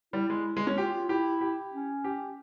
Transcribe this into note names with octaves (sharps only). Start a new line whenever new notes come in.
G3 E4
G#3
G#3
C#4
F4 G4
F4
E4 G4
G4
C#4
G4